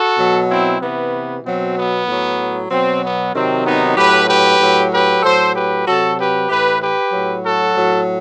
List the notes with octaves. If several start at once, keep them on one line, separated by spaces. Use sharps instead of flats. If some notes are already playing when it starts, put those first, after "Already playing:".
Already playing: F#4 A4
B2 F#3
C4 E4
C3 E3 B3
B2 F#3 C4
B3
A2 F#3
B2 F#3 C4
B3
C3 D#3 F#3 C4
B3 D#4
A2 F#3 G4 B4
G4 B4
A2 F#3
G4 B4
A2 F#3 A4 C5
G4 B4
C3 F#3 F#4 A4
G4 B4
A2 E3 G4 B4
G4 B4
A2 F#3
F#4 A4
A2 F#3